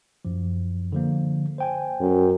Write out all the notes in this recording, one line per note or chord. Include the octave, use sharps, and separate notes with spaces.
F#2 F3
D3 F3 A#3
C5 G5 G#5
F#2